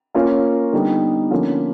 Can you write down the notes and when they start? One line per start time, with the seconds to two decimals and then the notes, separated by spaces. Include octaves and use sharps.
0.15 A#3 C#4 F4 A#4 C#5
0.72 D3 G3 B3 D#4
1.31 D3 F3 A#3 C#4